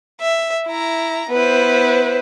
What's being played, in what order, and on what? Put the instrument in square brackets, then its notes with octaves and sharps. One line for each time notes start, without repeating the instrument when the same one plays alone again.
[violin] E5
E4 A#5
[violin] B3 E4 [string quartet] B4 C5